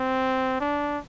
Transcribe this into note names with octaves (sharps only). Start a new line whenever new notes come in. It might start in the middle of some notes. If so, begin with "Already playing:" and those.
Already playing: C4
D4